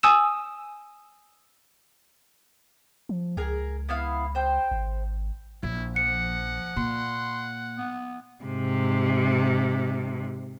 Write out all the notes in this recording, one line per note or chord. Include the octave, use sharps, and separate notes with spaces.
G#5 D#6 E6 E7
F3
C#2 G#4 A#4
B3 E4 F5
C5 G5
G#1
A#1 E4
F3 F#5 C#7
A#2 C6
B3
G#2 C3